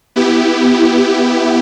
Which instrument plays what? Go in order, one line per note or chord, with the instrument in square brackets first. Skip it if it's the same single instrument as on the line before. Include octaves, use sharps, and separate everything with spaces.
[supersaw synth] B3 E4 G4